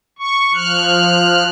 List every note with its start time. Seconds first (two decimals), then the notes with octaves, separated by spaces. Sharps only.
0.19 C#6
0.54 F3 F6 F#6